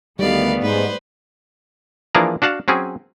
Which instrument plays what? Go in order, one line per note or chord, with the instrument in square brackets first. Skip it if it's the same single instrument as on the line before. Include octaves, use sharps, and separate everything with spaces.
[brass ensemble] D2 D#3 [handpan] G3 [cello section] A3 B3 [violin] D5 F5
[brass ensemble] G#2 [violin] B4 C5
[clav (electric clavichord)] E3 F3 A#3 D4 G#4 A#4
D4 F#4 F5 F#5 A5
F#3 C4 C#4 G#4